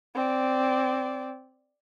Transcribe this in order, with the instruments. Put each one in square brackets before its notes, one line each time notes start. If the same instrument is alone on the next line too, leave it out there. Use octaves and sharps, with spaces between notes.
[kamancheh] C4 D5